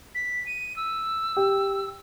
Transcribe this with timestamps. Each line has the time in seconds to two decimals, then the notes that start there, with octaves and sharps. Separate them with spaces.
0.15 B6
0.46 D#7
0.76 E6
1.37 G4